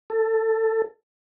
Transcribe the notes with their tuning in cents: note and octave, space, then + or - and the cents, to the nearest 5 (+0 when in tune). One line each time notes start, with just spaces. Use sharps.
A4 +20